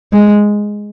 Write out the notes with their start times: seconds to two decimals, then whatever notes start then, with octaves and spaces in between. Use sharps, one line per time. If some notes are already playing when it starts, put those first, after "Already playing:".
0.13 G#3